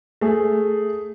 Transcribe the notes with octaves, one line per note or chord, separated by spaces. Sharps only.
A3 G#4